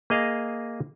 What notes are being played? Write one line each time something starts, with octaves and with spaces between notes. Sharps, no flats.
A#3 G#4 D#5 F5